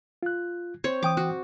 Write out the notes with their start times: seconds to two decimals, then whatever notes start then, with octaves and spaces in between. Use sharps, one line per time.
0.23 F4 F#6
0.84 C4 C#5
1.03 E3 G5 D6 D#6
1.17 F#4